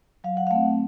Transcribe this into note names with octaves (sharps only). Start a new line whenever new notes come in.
F#3 F5
F#5
F5
A3 C4 F#5